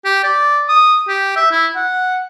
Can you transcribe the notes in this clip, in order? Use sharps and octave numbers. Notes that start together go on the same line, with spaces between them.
G4
D5
D#6
G4
E5
E4
F#5